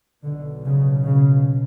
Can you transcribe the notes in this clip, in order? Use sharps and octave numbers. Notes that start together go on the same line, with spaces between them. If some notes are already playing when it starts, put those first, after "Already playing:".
B1 B2 D3
C#3
C#3